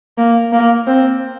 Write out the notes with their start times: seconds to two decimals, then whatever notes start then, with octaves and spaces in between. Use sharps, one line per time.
0.18 A#3
0.53 A#3
0.88 C4